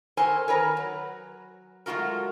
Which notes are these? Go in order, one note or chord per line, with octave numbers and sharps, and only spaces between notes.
A4 A#4 C5 C#5 G#5
D#3 A#4 B4 C#5
F#3
F#3 G#3 A3 F4 F#4 A#4